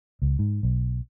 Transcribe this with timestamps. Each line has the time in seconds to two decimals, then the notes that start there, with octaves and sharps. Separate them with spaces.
0.22 C#2
0.39 G#2
0.63 B1